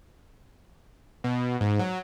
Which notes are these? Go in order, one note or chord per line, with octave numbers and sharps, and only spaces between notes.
B2
G#2
F#3